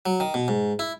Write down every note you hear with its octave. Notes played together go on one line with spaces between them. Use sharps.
F#3
D#3
B2
G#2
E4